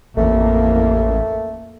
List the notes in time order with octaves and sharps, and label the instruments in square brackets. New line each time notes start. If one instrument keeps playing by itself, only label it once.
[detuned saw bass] A1 [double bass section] F2 A#3 [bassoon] A3